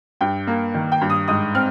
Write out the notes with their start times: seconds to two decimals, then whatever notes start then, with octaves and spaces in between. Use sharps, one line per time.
0.21 G2 G5
0.47 A#3
0.74 D#3
0.92 G5
1.01 G2
1.10 D#6
1.28 G#2 D#6
1.55 C4 F6